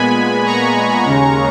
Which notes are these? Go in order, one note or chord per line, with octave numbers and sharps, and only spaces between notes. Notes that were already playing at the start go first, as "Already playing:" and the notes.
Already playing: A#2 G#3 B3 G#5 B5
A#5 C#6
D#2 C#3 G#3 C#4